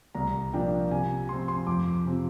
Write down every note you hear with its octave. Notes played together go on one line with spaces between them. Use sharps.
C2 A#5
A#2 F3 A#3 D4 G5
C3 G#5
F3 C4 C6
C6
F2 D6
C3 F3 C4